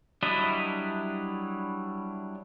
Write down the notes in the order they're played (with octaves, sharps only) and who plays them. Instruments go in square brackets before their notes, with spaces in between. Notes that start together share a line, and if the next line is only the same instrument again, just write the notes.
[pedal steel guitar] F#3 G3 D4 E4 D#5